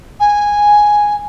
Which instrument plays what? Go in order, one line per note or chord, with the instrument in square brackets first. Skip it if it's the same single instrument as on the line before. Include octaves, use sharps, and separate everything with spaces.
[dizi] G#5